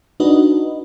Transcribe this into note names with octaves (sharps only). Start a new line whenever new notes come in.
D4 D#4 F#4 B4 D#5